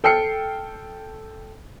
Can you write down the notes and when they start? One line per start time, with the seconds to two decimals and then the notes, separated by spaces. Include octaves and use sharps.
0.04 A4 G5 F6 C7 C#7